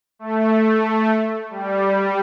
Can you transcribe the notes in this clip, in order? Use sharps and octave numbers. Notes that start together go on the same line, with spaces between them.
A3
G3